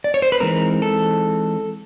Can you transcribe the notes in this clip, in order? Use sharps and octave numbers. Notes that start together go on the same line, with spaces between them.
D5
C#5
C5
B4
E3 G#3 C4 D#4 A#4
A4